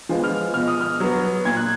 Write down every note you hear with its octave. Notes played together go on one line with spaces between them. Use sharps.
F3 G#3 B3
F6
B2 F6
D#6
F6
F#3 B3
A#2 G#6
F#6